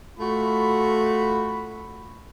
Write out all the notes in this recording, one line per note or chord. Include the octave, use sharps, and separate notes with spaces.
A3 F4 F#4 B5